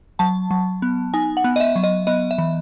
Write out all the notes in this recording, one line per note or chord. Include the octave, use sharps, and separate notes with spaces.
F#3 A5
F#3
B3
D#4 G#5
F#5
B3
D#5
E5
F#3
D#5
B3 D#5
E5
E3